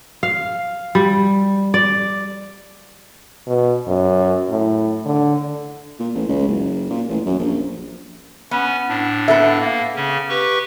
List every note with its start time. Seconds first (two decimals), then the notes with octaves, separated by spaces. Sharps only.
0.23 F5
0.95 G3
1.74 D5
3.47 B2
3.88 F#2
4.50 A2
5.06 D3
5.99 A#2
6.15 A1
6.29 C#2
6.48 F#1
6.90 A#2
7.09 A1
7.26 F#2
7.39 A#1
8.51 B3 C#4
8.89 A2 D4
9.28 B3 A4 E5
9.60 A#3
9.96 C#3 C#4
10.29 G4 B4 C#6